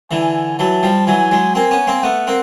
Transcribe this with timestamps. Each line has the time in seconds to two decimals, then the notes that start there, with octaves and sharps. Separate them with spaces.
0.11 D3 E3 G#5
0.59 E3 F#3 A5
0.83 F3 G3
1.07 E3 F#3 G#5
1.31 F#3 G#3
1.55 A#3 C4 G#5
1.71 B3 C#4
1.87 A#3 C4
2.03 A3 B3 F#5
2.27 A#3 C4